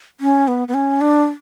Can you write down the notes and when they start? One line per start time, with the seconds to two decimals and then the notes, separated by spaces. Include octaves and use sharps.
0.20 C#4
0.48 B3
0.68 B3
0.74 C#4
1.01 D4